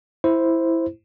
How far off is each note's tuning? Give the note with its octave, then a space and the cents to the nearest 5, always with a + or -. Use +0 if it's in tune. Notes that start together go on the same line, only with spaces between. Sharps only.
E4 +0 C5 +0